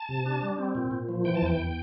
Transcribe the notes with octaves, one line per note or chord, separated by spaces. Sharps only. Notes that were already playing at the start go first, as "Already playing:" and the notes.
Already playing: A5
C3
D4
G3
C4
A#2
A#2
F3
E3 G5
A5
E2 G5
E2